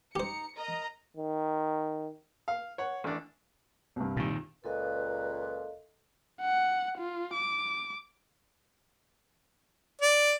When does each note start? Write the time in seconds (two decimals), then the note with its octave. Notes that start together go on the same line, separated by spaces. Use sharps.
0.16 D#4 G4 C5 A#5 C#7
0.58 A#4 D#5 A#5
1.17 D#3
2.48 F5
2.78 C#5 F#5
3.04 A1 D4
3.96 C2 G2
4.17 A#2 D#3
4.64 C#2 A#2 A4 B4 D#5 F5
6.41 F#5
6.98 F4
7.34 D6
10.01 D5